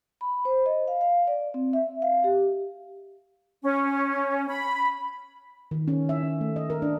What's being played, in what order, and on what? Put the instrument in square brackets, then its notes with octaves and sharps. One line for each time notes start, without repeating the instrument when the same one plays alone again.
[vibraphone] B5
C5
D#5
F5
F5
D5
C4
E5
F5
G4
[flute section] C#4
B5
[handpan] D#3
C#4
E5
C#4
A3
D#5
A#4
D4